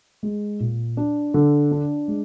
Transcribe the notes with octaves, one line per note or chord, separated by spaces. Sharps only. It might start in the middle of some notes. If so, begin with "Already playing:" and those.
G#3
A#2
D4
D3
D4
G#3